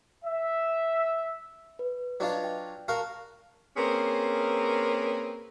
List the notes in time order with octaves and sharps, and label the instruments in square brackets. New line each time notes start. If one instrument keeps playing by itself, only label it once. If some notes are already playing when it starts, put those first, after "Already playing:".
[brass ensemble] E5
[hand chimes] B4
[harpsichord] F#3 D4 F4 [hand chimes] B4 D#5 D6
[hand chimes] G5
[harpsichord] F#4 A#4 F5 [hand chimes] A5
[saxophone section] A#3 C4 C#4 G#4 A#4 B4